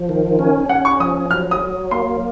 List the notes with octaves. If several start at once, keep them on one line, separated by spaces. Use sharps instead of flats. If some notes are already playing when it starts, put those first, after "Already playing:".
Already playing: F3
D#3
C#4
C#4 F#5
C#6
F3 D#6
F#3 F6
D#6
F#3
A#3 C6